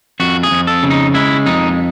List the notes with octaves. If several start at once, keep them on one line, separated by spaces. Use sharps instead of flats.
F2 F#4
G#4
F2
A4
C#3
D#4
G#3 E4
F2 D#4